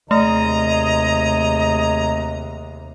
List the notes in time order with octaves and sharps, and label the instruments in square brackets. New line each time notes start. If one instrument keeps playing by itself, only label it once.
[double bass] D#2 C3 [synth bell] A3 [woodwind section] G#4 D#5 [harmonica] A#5